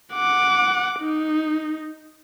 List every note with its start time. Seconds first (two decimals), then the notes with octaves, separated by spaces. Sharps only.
0.14 F#5 D6
1.00 D#4